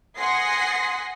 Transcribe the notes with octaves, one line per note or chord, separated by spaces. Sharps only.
F#5 G#5 C6 D#6 A#6 C7